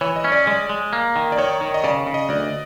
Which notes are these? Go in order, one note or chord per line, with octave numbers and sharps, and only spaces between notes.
E3 C#5
D#5
C#4
D5
G#3 D5
G#3
A#3
D#3
D5
D#3 C#5
D#3
D#5
C#3 D5
C#3
D#5
D2 D5